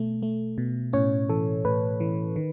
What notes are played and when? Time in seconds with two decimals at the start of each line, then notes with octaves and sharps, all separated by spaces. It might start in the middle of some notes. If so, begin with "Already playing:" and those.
Already playing: B2 A3
0.22 A3
0.58 B2
0.93 A2 C#4 C#5
1.29 E3 A4
1.65 A2 B4
2.00 E3
2.36 D#3